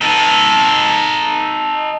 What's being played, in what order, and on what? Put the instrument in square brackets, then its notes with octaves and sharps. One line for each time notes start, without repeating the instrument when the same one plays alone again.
[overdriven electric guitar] D#4 A4